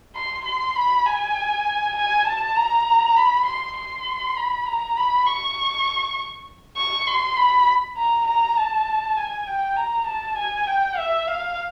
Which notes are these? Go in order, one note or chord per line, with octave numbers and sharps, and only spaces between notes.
C6
C6
B5
G#5
G#5
A5
A#5
B5
C6
C6
B5
A#5
B5
C#6
C#6
C6
B5
A#5
A#5
A5
G#5
G5
A#5
A5
G#5
G5
E5
F5